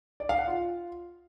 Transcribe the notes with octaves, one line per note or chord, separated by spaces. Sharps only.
D5
F5
F#5
F4